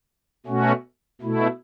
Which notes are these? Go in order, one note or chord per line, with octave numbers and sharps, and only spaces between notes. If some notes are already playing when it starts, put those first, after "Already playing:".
B2 A3 C#4 F#4
B2 A3 E4